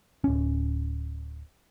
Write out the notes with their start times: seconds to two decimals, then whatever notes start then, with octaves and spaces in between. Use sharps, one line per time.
0.24 D1 C#4